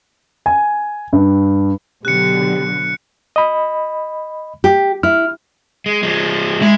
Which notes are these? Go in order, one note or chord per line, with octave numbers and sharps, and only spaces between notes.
G#5
G2
B2 D3 F#3 G4 F#6 C#7
D#5 B5
G4
E4 F6
G#3
F3 G#3
G#3 E4